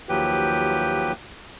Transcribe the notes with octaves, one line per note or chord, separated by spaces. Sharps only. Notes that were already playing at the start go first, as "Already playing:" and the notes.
D#2 F3 F#3 G4 B4 G5